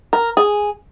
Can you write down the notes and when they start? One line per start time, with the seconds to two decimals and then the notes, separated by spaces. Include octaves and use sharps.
0.13 A#4
0.37 G#4